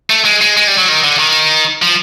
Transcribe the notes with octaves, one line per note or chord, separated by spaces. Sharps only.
A3
G#3
G#3
G#3
G3
F#3
D#3
D3
D#3
F3